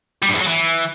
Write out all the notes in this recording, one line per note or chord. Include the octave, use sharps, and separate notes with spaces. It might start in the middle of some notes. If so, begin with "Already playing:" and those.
G3
G2
E2
F#3
E3